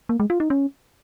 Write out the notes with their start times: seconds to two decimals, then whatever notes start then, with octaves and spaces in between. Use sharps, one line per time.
0.09 A#3
0.20 G#3
0.30 F4
0.40 D#4
0.50 C#4